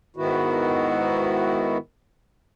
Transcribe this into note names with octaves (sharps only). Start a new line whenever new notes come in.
G#2 D#3 B3 E4 F#4